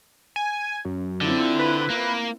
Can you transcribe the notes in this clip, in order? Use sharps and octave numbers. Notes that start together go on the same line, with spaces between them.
G#5
F#2
D3 C4 E4 F4
B4
A#3